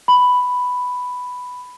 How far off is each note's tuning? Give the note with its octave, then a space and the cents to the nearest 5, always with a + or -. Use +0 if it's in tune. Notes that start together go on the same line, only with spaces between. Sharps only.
B5 +5